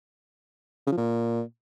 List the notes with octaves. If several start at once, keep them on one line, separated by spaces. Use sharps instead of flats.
C#3
F3
A#2